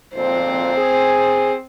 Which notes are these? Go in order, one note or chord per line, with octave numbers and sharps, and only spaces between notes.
G#1 F2 A#2 C4 C5
G#4